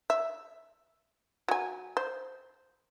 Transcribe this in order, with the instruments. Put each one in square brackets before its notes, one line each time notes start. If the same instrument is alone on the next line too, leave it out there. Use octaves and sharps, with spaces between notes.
[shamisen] E5
F#3 G#5
C5